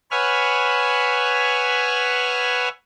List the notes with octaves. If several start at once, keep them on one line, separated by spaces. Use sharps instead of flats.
B4 C#5 E5 F#5 G#5 F6